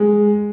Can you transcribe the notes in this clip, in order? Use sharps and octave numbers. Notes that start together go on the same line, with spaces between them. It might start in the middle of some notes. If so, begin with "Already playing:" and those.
Already playing: G#3